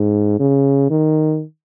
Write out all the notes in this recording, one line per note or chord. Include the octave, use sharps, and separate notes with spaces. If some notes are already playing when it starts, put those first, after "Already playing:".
Already playing: G#2
C#3
D#3